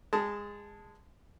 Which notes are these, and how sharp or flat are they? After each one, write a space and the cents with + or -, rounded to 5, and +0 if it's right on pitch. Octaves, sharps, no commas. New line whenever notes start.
G#3 -20 A5 +0 D#6 +20